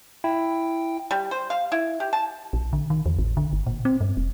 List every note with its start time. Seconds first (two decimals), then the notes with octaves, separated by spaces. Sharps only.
0.24 E4 G5
1.11 G3
1.31 C5
1.50 F5
1.72 E4
2.00 G4
2.13 A5
2.53 A#1
2.73 D3
2.90 D#3
3.06 E2
3.19 A1
3.37 D3
3.53 G1
3.67 A#2
3.85 C4
4.01 G2
4.17 E1